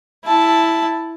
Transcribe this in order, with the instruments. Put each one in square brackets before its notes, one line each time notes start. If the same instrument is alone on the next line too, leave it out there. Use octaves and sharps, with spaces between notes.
[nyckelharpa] E4 A5